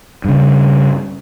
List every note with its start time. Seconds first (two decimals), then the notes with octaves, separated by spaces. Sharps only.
0.25 G2 C#3